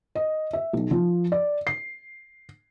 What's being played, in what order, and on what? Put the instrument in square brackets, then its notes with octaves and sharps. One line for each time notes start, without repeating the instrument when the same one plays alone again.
[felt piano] D#5
E5
B1
F3
D5
C7